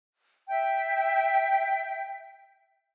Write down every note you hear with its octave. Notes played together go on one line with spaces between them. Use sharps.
E5 G5